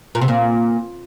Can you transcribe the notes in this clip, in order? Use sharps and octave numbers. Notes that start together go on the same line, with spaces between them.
A#2
C3
A#2